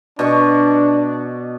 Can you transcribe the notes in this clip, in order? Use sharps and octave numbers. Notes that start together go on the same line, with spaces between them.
B2 D4 C#6